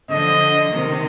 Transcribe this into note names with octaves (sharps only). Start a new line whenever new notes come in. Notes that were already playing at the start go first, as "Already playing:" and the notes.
D3 F3 D#5
C3 D#3